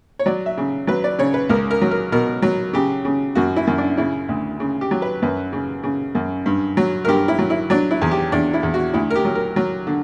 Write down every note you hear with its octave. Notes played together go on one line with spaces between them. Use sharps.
C#5
F#3 D5
E5
C#3
F#3 B4
D5
C#3 C#5
B4
C#2 A#4
A#4
F#3
A#4
B2 A#4
F#3
C#3 G4
C#3
F#2 F#4
E4
F#2
D4
C#3 E4
D2
C#3
G4
F#3
B4
F#2 B4
C#3
C#3
F#2
G2
F#3
A#4
G2 G4
E4
F#3
E4
F#3 D4
E4
E2
G4
E2 D4
E4
E2
F#4
D2 E4
A#4
G4
F#3
A#4
F#3
D3